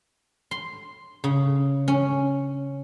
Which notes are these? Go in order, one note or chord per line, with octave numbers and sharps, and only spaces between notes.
C6
C#3
C#4